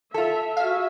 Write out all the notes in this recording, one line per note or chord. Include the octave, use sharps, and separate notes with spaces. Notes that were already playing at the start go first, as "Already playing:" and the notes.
F4 A4 E5
F#4 G#4 E5 F5